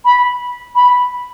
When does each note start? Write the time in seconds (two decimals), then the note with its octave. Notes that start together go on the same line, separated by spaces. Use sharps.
0.05 B5
0.76 B5